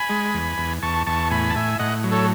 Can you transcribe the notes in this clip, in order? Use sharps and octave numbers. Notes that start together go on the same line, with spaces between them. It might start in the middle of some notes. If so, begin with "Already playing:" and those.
Already playing: G#5 B5
G#3
E2
E2
E2 A5 C#6
E2 A5 C#6
A2 G#5 B5
A5
A2 E5 G#5
A2 D#5 F#5
F#3
A4 C#5